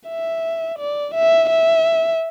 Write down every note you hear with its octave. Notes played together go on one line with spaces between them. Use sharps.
E5
D5
E5
E5